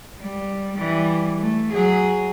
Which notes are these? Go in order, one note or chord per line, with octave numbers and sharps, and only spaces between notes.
G3
E3 G3
A3
F#3 G#4